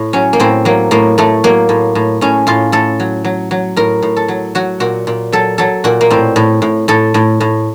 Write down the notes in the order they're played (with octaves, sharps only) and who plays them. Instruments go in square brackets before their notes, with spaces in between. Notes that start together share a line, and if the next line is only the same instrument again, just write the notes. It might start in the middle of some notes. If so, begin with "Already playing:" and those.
Already playing: [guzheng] A2
F#3 C#4
A#3
A2 C4
F#3 A#3
A2 A#3
A2 A3
F#3 A#3
A2
A2
A2 C#4
A2 F4
A2 A4
F#3
F#3
F#3
A2 A#4
A2
A4
F#3
F#3 F#4
A#2 F#4
A#2
F#3 A4
F#3 A4
A#2 F#4
A#3
A2 C4
A2
A2
A2 A4
A2
A2